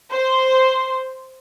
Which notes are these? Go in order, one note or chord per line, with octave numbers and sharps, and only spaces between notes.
C5